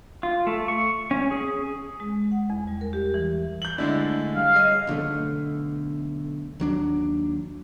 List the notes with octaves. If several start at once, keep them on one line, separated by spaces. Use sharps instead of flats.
F4
A3
C#6
C#4
G#4
G#3
F#5
E2
G3
A#4
G4
E3
G6 F#7
D3 G#3 A3 D4 E4 D5
G3 F5
G#4 C#5 D#5
B1 D3 F#3 A3
D#2 F#3 D4